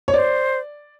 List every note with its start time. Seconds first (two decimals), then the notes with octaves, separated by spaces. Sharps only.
0.08 C#5
0.14 C5 D5